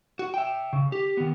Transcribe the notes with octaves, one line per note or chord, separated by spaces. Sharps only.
F#4
E5 G5
C#3
G4
D#3 B3